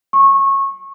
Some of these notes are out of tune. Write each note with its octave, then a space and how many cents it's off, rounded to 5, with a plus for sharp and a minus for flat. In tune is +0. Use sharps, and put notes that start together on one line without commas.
C#6 -20